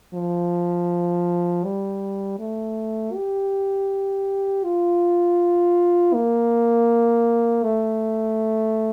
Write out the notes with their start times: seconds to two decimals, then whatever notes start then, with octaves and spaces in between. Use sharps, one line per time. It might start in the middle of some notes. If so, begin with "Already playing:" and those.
0.14 F3
1.64 G3
2.39 A3
3.14 G4
4.64 F4
6.14 A#3
7.64 A3